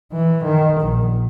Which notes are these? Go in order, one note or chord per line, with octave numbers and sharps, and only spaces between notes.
E3
D#3
A#1